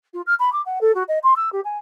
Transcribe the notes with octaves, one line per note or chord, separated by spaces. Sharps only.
F4
F6
B5
D6
F#5
A4
F#4
D#5
C6
E6
G4
G#5